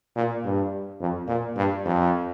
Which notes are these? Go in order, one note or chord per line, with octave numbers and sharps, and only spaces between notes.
A#2
G2
F2
A#2
G2
F2